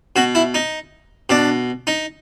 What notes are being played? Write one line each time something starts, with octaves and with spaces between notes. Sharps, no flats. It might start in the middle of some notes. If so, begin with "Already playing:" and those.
B2 F#4
E4
D#4
B2 D4
D#4